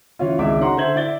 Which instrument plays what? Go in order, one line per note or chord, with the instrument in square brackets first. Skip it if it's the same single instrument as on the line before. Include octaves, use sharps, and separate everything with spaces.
[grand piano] E3 C#4 F4
G#1 C#2 E4 D5 E5 D6
C#4 D#4 F#4 F#5 A#5 C6
D3 C5 E5 G#6 F#7
E4 D5 A6 G7